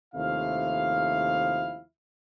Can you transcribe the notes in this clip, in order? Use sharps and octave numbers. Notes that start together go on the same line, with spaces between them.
D#2 C3 F3 A3 E4 F5